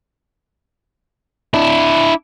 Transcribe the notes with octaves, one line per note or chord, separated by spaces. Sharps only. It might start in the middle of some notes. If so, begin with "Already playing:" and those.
D4 E4